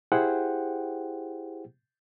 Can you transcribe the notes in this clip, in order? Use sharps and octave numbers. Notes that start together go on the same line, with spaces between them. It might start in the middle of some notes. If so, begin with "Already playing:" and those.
E4 G4 G#4 C5 F#5 G5